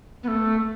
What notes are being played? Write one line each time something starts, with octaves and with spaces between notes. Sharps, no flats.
B3
A3